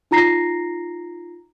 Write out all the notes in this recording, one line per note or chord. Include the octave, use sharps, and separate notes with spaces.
D#4 F4 A#5 A#6 C7